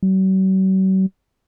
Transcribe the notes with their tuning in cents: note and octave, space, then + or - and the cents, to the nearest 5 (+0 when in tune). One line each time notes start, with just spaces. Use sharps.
F#3 +45